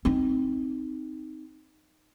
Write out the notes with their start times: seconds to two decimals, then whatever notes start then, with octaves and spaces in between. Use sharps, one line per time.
0.05 C4 D#4